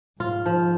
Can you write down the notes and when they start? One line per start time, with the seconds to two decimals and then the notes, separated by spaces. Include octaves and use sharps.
0.20 G#2 F4
0.46 F3